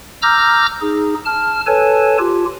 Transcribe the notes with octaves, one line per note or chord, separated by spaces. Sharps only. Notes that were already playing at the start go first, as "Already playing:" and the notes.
A#5 D6 E6 F6 G6 A#6
D#4 G#4
A5 F6
A4 B4 C#5 G#5 A5
F4 G4